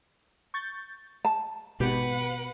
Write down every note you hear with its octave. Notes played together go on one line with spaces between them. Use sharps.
C#6 G6 A6
A5
G#1 B2 G4 B4 F#5